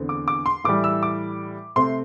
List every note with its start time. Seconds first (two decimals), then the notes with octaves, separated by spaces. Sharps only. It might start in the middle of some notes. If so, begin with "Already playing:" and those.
Already playing: E2 D3 C4
0.09 D6
0.28 D6
0.46 C6
0.64 A2 E3 G3 D6
0.84 E6
1.03 D6
1.76 C3 A3 C4 C6